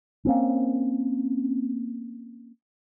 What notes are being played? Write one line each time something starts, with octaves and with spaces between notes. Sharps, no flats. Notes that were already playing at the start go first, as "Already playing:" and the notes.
A#3 C4 C#4